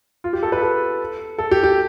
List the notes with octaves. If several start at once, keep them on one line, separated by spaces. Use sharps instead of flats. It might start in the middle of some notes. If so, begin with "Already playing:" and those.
F4
G4
A4
B4
A4
A4
G4
G4